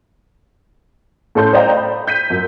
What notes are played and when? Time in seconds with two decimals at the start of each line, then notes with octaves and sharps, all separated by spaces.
1.35 A2 C#4 A4 C6 G6
1.53 C5 D5 D#5 F5 G5 A#5
1.77 B5
2.07 G6 B6 D#7
2.30 F#2